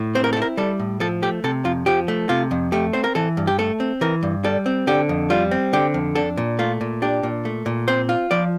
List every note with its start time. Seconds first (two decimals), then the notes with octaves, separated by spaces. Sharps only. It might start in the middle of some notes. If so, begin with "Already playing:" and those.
Already playing: A2
0.15 C4 C5
0.24 A#4
0.33 A4
0.37 E4
0.42 A#4
0.57 G3 A4
0.79 A2
1.00 F3 A4
1.22 A3 G4
1.44 C3 A4
1.65 F2 F4
1.86 F3 G4
2.08 A3
2.29 C3 F4
2.51 F2
2.72 A3 G4
2.93 C4 C5
3.04 A#4
3.15 E3 A4
3.37 G2
3.47 G4
3.59 A3 A4
3.80 C4
4.01 E3 A#4
4.23 G2
4.44 G3 A4
4.66 C4
4.87 D3 G4
5.09 F2
5.30 G3 F4
5.51 C4
5.73 D3 G4
5.94 F2
6.15 D4 A4
6.37 A#2
6.59 A3 F4
6.81 A#2
7.02 D4 G4
7.23 A#2
7.45 A3
7.66 A#2
7.88 C4 C5
8.09 F4
8.31 F3 D5